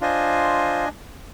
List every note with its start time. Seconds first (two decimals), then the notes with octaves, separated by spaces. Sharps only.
0.01 D4 F4 C5 D#5 G#5